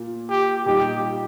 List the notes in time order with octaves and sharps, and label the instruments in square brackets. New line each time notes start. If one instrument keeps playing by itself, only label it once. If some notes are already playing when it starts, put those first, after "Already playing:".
Already playing: [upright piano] A#2 A#3
[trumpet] G4
[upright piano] A#2 G3 D#4 [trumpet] G4